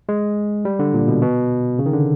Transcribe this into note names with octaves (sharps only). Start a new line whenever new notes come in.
G#3
G3
D3
A#2
B2
B2
C#3
D#3
D3